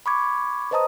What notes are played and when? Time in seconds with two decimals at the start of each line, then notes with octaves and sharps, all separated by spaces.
0.06 B5 C#6 D6 G#6
0.71 B4 C5 D#5 A5 A#5 D#6